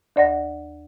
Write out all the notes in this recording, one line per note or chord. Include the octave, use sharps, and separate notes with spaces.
D#2 D5 F#5 A#6